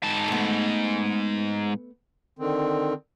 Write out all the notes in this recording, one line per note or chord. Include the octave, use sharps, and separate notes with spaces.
G#2 A5
A3 B3
D3 D#3 C4